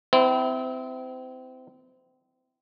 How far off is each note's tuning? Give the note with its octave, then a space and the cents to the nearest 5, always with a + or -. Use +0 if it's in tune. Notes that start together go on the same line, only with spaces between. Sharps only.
C4 -30 E4 +0